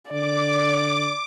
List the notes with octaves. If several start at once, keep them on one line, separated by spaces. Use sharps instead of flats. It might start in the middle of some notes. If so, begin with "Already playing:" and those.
D3 D5 D6